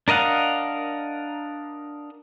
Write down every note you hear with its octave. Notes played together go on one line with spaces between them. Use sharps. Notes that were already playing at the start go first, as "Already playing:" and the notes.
D4 A#4 D#5 F5 F#5